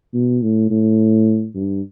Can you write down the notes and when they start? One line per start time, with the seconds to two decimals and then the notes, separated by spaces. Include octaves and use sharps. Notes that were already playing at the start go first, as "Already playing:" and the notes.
0.14 B2
0.43 A2
0.70 A2
1.55 G2